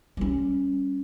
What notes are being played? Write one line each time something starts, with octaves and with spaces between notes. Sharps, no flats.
G3 C#4